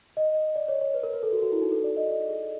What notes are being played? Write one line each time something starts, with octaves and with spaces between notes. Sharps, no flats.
D#5
D5
C#5
C#5
B4
A#4
B4
A4
F#4
F#4
E4
D#4
A4
D5
D#5
D5
G#4